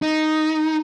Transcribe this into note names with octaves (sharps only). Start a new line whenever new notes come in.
D#4